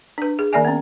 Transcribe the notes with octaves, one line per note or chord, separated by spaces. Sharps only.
D4 B4
G#4
D#3 A#3 D5 E5 G#5
B3 C#4